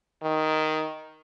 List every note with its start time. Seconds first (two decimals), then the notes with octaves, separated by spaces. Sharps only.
0.23 D#3